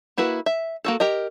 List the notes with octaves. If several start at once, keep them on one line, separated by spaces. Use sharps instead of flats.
A#3 E4 F#4 B4
E5
A#3 F#4 A4
G4 A#4 D#5